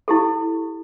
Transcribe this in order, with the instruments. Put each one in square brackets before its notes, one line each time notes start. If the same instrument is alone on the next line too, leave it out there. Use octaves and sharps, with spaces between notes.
[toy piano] E4 G4 A4